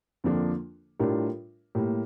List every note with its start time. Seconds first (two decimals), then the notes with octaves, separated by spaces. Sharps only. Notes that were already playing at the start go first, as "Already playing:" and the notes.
0.24 F2 D3 F3 A#3 D4
1.00 A2 G3 D4 F4 A#4
1.75 A2 G3 A#3